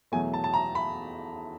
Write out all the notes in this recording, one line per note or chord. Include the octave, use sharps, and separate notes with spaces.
E2 B2 F#3 A3 G#5
A5
A5
A#5
B5